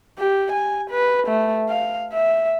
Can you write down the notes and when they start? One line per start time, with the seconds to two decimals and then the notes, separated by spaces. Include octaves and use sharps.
0.19 G4
0.53 G#5
0.91 B4
1.27 A3
1.70 F5
2.13 E5